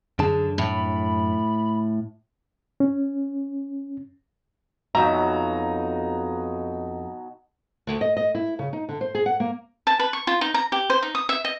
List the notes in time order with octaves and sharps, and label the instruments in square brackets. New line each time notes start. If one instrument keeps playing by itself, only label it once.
[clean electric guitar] F#2 D4 A5 [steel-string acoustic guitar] D3 [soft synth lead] G#4
[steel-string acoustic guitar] A2 [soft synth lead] B5
[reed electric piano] C#4
[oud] F2 E5 [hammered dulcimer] B2 F#3 D#4 [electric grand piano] A#5
[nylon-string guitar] D2
D#5
D#5
E4
C#3
D#4
D3
C5
G#4
F#5
A#3
[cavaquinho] A5
B4
C#6
F4
D#4
A#5
G4
C5
D#4
D#6
E5
D#5